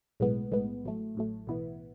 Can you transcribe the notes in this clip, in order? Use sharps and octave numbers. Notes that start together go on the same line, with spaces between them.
B1 A2 G#3 B3
B1 A2 G#3 B3
A1 A2 F#3 A3
A1 A2 F#3 A3
B1 A2 E3 B3 E4